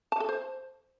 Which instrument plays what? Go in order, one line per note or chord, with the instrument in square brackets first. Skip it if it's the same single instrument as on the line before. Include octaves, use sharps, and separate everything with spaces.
[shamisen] A5
A4
C5